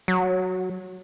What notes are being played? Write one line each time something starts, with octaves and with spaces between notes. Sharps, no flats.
F#3